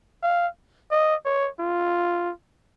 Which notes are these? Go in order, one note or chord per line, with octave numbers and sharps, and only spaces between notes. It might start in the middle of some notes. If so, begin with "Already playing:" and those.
F5
D#5
C#5
F4